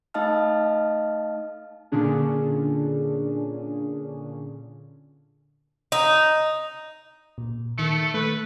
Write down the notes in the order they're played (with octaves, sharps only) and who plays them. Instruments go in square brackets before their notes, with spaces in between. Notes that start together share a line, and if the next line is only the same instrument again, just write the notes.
[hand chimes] A3 D#4 D#5 F5 A5 F6
[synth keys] A#2 D3 C#4 D4 G#4
[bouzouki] D#4
[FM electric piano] A#2
[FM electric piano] D#3 C#7 [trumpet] A3
[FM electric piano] A3 [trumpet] B4